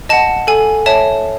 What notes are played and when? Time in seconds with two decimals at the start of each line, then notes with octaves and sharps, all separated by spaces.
0.09 D#5 F#5 A5
0.47 A4 G#5
0.86 C#5 E5 A5